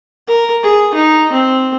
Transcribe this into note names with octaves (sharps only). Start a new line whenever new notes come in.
A#4
G#4
D#4
C4